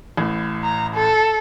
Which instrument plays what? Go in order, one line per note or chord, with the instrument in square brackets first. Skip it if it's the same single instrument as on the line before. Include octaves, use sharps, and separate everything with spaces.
[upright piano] A1 A2
[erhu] A#5
A4